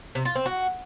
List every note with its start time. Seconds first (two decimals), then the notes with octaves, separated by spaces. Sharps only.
0.15 C3
0.25 F4
0.35 C4
0.46 F#4